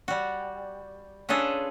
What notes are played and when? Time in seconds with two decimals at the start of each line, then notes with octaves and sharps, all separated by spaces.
0.08 G3 F#4
1.29 C#4 D4 F4 G#4 A4 B4